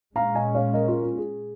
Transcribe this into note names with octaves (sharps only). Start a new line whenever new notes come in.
A#2 G#3 C#4 F5 A#5
D#5 G#5
C#5 F5
A#4 D#5
F4 A#4
F4
G#4